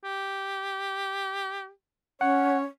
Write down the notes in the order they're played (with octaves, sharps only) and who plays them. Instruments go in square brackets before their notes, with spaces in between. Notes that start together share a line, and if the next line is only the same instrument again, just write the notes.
[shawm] G4
[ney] C#4 [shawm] C#5 [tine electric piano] F#5